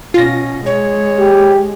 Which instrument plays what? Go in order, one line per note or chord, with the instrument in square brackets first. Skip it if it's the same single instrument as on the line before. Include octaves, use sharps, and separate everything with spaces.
[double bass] B2 C#4 [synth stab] F4 A#6
[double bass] G#3 [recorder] C#5
[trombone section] G4